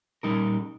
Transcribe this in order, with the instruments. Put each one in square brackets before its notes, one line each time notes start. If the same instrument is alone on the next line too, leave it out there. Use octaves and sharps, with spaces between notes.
[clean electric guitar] A#2 G3 D#4 A#4